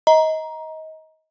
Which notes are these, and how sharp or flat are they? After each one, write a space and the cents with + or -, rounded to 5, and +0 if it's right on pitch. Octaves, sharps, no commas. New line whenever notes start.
D#5 +25 A#5 +15